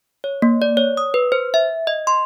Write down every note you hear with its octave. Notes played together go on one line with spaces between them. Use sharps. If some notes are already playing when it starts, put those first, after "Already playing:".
C#5
A#3
D5
C#5
D#6
B4
C5
E5
D#5
C6